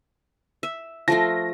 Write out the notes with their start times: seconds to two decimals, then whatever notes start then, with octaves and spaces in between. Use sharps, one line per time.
0.63 E5
1.08 F3 A3 F4 A#6